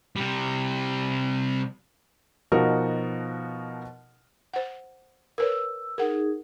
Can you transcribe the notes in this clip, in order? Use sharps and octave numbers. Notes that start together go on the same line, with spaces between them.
C3 G3
B2 F3 D#4 F#4 A#4
C5 F#5
A#4 B4 C#5 E6
D#4 G#4 A#4 F#5